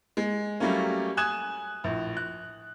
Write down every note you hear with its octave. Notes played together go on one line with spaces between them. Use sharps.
G#3
F#3 G3 A3 A#3 C#4
G#5 D#6 F#6 G#6 E7
A#1 A2
F#6